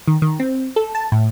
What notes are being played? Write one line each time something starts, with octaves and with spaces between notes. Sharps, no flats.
D#3
D#3
C4
A4
A5
A2